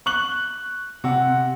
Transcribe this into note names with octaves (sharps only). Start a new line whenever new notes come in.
C#6 F#6 F#7
C3 F#5